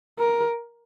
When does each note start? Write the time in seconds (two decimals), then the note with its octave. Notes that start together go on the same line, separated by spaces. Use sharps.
0.18 A#4